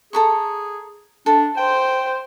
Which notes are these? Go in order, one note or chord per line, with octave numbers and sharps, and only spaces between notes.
G#4 A4 A#5 C#6
D4 A4
C5 G5